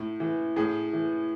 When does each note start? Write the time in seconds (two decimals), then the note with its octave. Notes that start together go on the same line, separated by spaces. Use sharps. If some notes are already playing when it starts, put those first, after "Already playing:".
Already playing: A2
0.20 E3
0.56 A2 G#4
0.93 E3